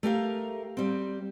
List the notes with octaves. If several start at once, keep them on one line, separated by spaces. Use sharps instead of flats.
A3 G4 A#4 F5
G3 C4